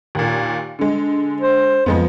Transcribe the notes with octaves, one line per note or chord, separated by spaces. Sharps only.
D#2 A#2
D3 G#3
C5
F2 F3 G#3 B3